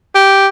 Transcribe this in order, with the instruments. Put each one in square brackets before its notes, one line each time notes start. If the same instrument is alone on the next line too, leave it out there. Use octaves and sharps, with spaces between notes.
[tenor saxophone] G4